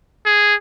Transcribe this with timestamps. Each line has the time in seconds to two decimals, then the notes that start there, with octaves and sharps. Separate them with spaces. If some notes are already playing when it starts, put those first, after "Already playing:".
0.26 G#4